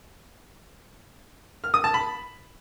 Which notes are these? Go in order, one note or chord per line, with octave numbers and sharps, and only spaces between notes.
F6
D#6
A5
B5